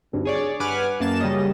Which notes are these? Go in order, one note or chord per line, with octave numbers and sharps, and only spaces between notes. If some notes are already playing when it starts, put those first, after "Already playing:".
G#1 D2 G2
G#4 C#5 D5
G2 B4 F#5 G#5 D6 F6
F#2 A#3 A5 E7
C#3 G3 C#4 D#5